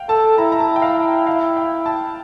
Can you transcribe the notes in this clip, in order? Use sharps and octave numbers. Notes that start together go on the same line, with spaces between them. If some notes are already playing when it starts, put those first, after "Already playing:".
Already playing: F5 G5
A4 A5
E4 A#5
A#5
A5
G5
F5
F5
G5
A5